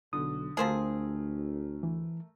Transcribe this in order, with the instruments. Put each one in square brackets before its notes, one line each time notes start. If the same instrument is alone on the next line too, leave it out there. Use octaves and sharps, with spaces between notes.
[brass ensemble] B1 [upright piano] D3 [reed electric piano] D#6
[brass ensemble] D2 [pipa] F3 C4 G#4 [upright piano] A3 A#4
[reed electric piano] E3